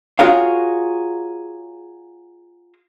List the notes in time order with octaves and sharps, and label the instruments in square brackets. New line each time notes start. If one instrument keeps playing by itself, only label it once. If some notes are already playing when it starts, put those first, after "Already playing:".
[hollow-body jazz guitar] F4 F#4 G#4 A#4 C#5 F5